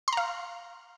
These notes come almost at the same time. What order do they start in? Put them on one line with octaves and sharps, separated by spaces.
C6 A#5 F5